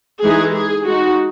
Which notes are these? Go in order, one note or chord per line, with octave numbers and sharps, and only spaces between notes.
E3 G#3 D#4 G#4
G#4
G#3 D#4 F#4